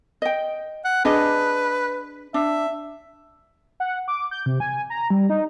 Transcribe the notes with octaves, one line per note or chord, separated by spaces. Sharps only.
D#5 G5
F#5
D4 G#4 B4 D#5
D4 E5
F#5
D6
G6
C3
G#5
A#5
G3
D#4